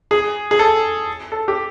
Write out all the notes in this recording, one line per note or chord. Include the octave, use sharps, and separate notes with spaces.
G#4
G#4
A4
A4
G4